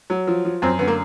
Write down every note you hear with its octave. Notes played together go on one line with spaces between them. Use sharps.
F#3
F3
F3
F#2 C4
D3 B3
A#3